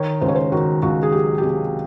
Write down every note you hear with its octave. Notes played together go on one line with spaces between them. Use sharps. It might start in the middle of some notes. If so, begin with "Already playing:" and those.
Already playing: D#3 C#5
C#2 C5
C#5
C5
D#3 F#4
C#2 F#4
G#4
F#3 G4
G4
C3 G#4